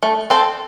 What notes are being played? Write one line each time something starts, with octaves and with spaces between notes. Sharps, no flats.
A3
C4 A4 C5